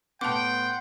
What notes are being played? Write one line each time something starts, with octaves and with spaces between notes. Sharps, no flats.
A2 B3 F#5 G5 A5 C6 D6